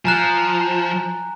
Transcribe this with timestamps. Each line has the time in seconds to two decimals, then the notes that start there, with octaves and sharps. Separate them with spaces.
0.05 F3 G#5 A#5 F#6